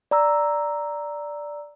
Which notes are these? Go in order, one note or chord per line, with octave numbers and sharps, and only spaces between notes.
D5 A#5 E6